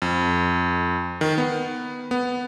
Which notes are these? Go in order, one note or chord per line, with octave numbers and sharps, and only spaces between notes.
F2
D#3
B3
B3